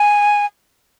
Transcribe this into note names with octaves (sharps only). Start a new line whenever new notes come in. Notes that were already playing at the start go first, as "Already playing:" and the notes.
Already playing: G#5